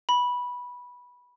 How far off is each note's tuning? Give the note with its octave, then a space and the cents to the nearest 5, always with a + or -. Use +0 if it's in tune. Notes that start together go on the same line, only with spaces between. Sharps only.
B5 -10